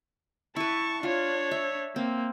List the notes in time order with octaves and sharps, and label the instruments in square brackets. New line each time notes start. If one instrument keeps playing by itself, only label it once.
[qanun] E4 B4 [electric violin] A5 C#6
[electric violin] D4 C#5 [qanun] F4
[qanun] E5
[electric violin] A#3 [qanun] C4